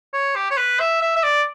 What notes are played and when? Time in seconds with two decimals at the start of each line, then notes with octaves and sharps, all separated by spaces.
0.14 C#5
0.36 G4
0.51 C#5
0.57 B4
0.80 E5
1.01 E5
1.16 E5
1.23 D5